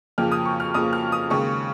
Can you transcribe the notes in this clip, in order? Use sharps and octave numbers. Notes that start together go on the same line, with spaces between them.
F2 C#3 F3 A#3 F6
D#6
C#6
F6
F2 C#3 F3 A#3 D#6
F6
D#6
D#2 C#3 G#3 C#6